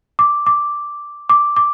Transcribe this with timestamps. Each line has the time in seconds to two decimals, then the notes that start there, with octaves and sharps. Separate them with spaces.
0.19 D6
0.47 D6
1.30 D6
1.56 D6